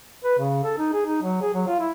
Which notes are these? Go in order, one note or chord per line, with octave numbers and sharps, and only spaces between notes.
B4
C#3
A4
D#4
G#4
D#4
F#3
G#4
F#3
F4
E4